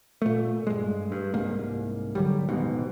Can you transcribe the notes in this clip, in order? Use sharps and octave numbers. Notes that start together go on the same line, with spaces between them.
A#2 A3
G2 G#3
G2
C2 G#2 A#3
D3 F#3 G3
A1 D#2 G#2 B2